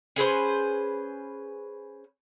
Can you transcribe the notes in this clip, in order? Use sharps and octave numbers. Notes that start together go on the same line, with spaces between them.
C#4 G#4 B4 C5